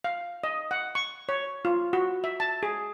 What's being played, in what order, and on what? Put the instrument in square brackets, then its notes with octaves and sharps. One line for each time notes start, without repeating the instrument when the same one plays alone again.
[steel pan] F5
D#5
F#5
C#6
C#5
F4
F#4
E5
A5
G#4